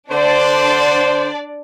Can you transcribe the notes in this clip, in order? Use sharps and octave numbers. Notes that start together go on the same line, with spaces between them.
D3 D4 C5 D5